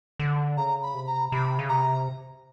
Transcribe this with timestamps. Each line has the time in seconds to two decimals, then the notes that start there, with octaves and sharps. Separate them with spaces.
0.19 D3
0.57 C#3 A#5
0.83 B5
0.94 C3
1.07 A#5
1.32 C3 B5
1.59 C#3
1.69 C3 A#5